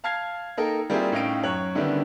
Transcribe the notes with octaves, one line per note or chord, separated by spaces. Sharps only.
F5 A5 F6 G#6 C7
A#3 D#4 A4 A#4 G5
G3 A#3 C4 E4 F4 G#4
A2 C#4 D#4 F5 G5 D7
F#2 C#5 F#6 F#7
D3 D#3 G3 B3 C#4 E4